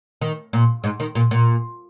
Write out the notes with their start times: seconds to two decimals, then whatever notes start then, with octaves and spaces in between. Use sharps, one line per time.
0.21 D#3
0.53 A#2
0.84 G#2
1.00 D#3
1.15 A#2
1.31 A#2